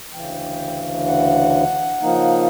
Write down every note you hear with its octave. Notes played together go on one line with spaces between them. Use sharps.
D2 C#3 E3 G5
F#5
C#3 F3 A#3 D#4